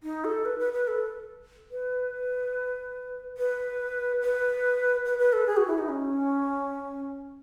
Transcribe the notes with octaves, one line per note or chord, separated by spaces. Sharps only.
D#4
A4
B4
B4
B4
A4
B4
B4
B4
B4
B4
A4
G#4
F#4
E4
D#4
C#4